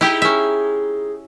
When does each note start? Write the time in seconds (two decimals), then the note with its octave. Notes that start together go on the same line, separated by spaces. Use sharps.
0.01 G#3 D#4 E4 G4
0.22 C#4 E5